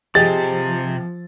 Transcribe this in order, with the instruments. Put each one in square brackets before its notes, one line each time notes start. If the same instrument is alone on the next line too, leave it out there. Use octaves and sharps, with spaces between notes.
[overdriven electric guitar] C3 [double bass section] F3 [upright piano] G4 G#4 D#5 [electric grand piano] A6